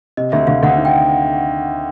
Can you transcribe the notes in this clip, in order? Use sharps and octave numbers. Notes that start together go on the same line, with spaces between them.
C3 D#5
D2 E5
D2 F5
D2 F#5
D#3
G5